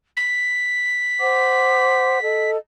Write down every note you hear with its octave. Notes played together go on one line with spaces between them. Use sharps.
B6
C5 F#5 D6
A4 D#5